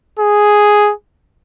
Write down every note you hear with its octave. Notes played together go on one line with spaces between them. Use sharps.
G#4